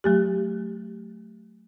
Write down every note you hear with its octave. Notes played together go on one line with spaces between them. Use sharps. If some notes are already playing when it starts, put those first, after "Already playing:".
F#3 A3 G4